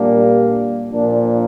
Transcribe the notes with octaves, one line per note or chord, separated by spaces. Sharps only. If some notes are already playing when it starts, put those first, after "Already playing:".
Already playing: A#2 G3 A#3 D4
A#2 F3 A#3 D4